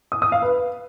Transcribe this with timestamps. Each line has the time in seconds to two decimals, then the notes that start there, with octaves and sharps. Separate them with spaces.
0.12 D#6
0.22 D#6
0.32 F5
0.42 B4